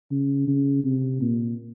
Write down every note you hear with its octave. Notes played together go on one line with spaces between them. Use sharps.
C#3
C#3
C3
A#2